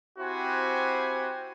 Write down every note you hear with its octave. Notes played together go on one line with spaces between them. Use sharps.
C4 E4 F#4 G4 C5 G#5